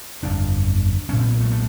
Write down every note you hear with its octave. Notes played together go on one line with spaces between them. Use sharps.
G1 F2 D3 D4
B1 A#2 C#4
C4
A#3
A3
A3